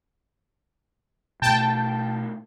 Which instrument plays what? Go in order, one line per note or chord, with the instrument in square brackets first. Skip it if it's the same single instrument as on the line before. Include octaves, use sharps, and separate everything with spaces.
[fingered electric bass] B2 A3 [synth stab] G5 A5